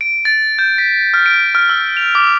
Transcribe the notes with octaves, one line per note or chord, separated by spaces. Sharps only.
D7
A6
G6
B6
F6
D7
F6
E6
F7
D6